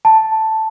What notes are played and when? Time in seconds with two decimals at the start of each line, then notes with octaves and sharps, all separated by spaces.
0.05 A5